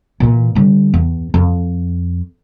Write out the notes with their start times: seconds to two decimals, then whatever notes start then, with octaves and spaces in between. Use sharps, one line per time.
0.20 A#2 E3
0.55 D3 G3
0.94 E2
1.34 F2